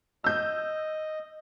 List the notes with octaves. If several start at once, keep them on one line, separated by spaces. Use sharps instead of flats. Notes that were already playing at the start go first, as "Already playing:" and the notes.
D#5 E6 G6